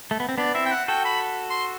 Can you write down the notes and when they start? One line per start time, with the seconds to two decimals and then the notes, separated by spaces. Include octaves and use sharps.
0.11 A3
0.20 B3
0.29 C4
0.38 B3 D4 D5
0.54 C4 E4 E5
0.66 G5
0.72 F#5
0.88 F#4 A4 G5
1.05 B5
1.50 C6